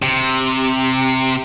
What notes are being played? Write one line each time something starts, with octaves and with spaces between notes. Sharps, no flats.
C3